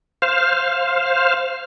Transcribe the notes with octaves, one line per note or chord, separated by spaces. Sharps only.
C5 F5